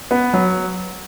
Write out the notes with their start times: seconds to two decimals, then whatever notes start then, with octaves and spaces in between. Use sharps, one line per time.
0.11 B3
0.33 F#3